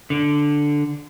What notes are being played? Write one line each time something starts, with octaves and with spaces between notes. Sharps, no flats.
D3